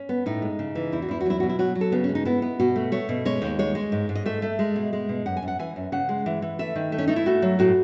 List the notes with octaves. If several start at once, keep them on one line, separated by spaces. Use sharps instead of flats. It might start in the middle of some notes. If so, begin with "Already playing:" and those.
Already playing: C#4
B3
A2 D#4
G#3
C#3
E3
E2 E4
F#4
E2 E4
F#4
F#3 E4
B2 F#4
E4
F#3 F#4
F#3
A4
C#3 B3
C#4
G#3
D#4
B3 E4
B3
B2 F#4
A3
A3 C#5
B2
G#3 C#5
D#2
G#3 C#5
G#3
G#2
G#2
D#5
A3 E5
A3
G#3
B2
G#3
B2
F#2 F#5
G#5
F#2
F#5
E3 G#5
F#2
C#3 F#5
G#3
E3
E3
A3 E5
D#3
A3
C#4
A3 D#4
E4
A3 F#4
F#3
A2 F#4